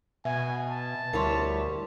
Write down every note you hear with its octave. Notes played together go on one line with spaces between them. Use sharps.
B2 E5 G#5
A5
D2 G3 E4 A#4 C#5 C6